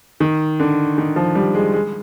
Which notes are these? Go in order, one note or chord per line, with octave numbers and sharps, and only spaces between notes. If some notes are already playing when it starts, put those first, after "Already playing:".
D#3
D3
D#3
F3
G3
G#3
G#3